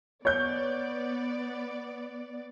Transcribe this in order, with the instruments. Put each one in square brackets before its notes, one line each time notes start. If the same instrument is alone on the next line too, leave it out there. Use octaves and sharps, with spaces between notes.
[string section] B3 D5 [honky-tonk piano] C#5 G6